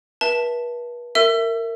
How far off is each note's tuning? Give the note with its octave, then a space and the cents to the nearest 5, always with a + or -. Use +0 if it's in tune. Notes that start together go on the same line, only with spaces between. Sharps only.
B4 -40 E5 +0 A5 +0
A#4 -25 E5 +5 E6 +35